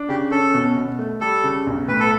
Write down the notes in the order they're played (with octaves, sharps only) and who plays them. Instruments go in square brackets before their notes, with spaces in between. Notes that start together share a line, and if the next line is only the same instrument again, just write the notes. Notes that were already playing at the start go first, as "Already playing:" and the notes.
Already playing: [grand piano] D4
[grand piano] C#3 [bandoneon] G4
[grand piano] C#4 [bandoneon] A4
[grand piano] B2
B2
A3
[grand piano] G3 [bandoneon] A4
[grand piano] C#3
B1
[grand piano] A2 [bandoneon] B4
[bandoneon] A4